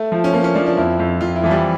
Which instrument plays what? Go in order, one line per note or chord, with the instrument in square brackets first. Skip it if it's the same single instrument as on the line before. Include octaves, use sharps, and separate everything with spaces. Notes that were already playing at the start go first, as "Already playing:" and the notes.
Already playing: [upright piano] A3
[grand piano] F3
[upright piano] C#4
[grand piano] F3 [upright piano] A#3
[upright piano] C#4
[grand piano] F3 [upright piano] D4
[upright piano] D4
[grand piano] F2 [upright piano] E4
[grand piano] F2
[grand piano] F2 [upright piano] F4
[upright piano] E4
[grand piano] E3 [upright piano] F3
[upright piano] G3